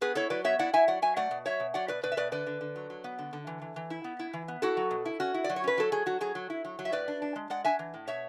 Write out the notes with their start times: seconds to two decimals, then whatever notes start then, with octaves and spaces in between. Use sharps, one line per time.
0.01 B3 G#4 B4
0.15 E4 A4 C#5
0.30 F#3 B4 D5
0.44 B3 C#5 E5
0.59 E4 D5 F#5
0.73 E4 E5 G#5
0.88 F#3 D5 F#5
1.02 F#3 E5 G#5
1.17 A3 D5 F#5
1.31 B2
1.45 F#3 C#5 E5
1.60 B2
1.74 F#3 D5 F#5
1.88 B2 B4 D5
2.03 B2 B4 D5
2.12 E5
2.17 B2 B4 D5
2.32 D3 B4 D5
2.46 D3
2.61 D3
2.76 F#3
2.90 F#3
3.04 B3
3.19 D3
3.33 D3
3.47 E3
3.62 E3
3.76 E3
3.90 E4
4.04 B3
4.19 E4
4.33 E3
4.48 B3
4.62 E4 F#4 A4
4.77 F#3
4.91 B2
5.05 E4
5.20 C#4 F#4
5.34 E4
5.44 D5
5.49 F#3
5.56 C#5
5.64 C#4 B4
5.78 F#3 A4
5.92 F#3 G#4
6.06 F#3 F#4
6.21 F#3 G#4
6.35 F#3
6.50 E4
6.65 F#3
6.79 F#3
6.85 E5
6.92 A2 B4 D5
7.08 D4
7.22 D4
7.36 G#3
7.50 G#3 D5 F#5
7.65 D4 E5 G#5
7.79 E3
7.94 A2
8.08 B2 C#5 E5